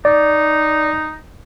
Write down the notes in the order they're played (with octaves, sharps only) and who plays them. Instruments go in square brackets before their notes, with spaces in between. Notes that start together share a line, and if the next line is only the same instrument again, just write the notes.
[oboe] D#4 [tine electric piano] D5